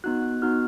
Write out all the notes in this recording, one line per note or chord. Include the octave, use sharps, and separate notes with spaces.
B3 D#4 F#4 F#6
F#6
B3 D#4 F#4 F6